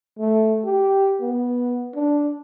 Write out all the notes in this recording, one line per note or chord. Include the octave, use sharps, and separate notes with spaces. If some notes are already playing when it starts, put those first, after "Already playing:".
A3
G4
B3
D4